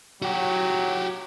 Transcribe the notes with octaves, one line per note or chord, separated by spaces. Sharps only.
F#3 F#4 G4